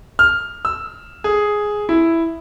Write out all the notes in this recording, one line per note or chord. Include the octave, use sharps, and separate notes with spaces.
F6
E6
G#4
E4